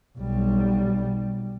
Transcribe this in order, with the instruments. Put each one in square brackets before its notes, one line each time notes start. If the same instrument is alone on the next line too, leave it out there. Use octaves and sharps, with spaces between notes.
[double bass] B1 G3